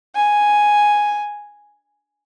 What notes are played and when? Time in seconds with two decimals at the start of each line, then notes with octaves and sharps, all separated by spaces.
0.16 G#5